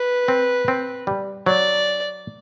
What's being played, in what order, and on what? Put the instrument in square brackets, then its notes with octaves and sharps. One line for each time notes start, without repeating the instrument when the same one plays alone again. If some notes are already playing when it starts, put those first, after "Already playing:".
Already playing: [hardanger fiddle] B4
[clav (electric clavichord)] C4
C4
G3
[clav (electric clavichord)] F#3 [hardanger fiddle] D5